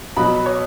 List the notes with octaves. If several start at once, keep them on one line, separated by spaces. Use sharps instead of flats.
B2 F#3 B5
C#5